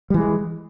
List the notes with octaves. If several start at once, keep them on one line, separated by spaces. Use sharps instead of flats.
E3 G3 G#3